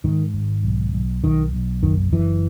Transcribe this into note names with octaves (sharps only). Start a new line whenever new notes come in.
G#2 D#3
G#1
B1
B1
B1 D#3
B1
F#1 D#3
F#1 E3